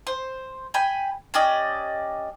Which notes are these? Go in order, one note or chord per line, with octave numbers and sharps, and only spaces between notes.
C5
G5 G#5 B5
C#4 G4 D5 D#5